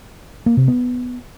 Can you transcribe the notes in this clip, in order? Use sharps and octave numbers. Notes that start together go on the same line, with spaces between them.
A#3
C3
B3